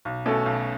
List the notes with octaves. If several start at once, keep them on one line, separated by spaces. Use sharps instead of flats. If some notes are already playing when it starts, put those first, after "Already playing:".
B1
B2 A3 C#4 A4
B1